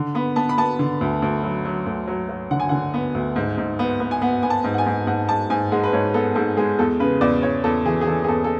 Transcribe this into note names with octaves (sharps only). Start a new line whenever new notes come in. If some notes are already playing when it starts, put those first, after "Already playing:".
Already playing: D3
B3 B5
B3 A5
B5
B3 A5
D3
D2
D2
F#3
F#3
D2
F#3
F#3
D3 F#5
G#5
D3 F#5
B3
D2
G#2
G#2
B3
B3
G#5
B3 F#5
B3 G#5
A5
G#2
F#5
G#5
G#2
G#2 F#5
G#2 A5
G#2 G#5
G#3 F#5
B4
G#2 C#5
B3 A4
G#2 A4
G#3 G#4
E2 A4
C#3 B4
E2 D5
E2 C#5
E2 A4
E3 G#4
G#4
E3 A4
G#4
E2 A4
A4